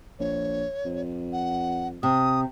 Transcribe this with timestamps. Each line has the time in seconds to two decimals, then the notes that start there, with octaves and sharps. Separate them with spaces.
0.19 A#1 C#5
0.85 F2
1.33 F#5
2.03 C3 D#6